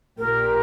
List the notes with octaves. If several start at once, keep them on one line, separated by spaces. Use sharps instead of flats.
A#1 A#2 A#3 G4 A#4